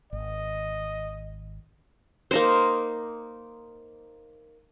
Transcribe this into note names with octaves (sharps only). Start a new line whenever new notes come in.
G#1 D#5
A#3 D#4 C5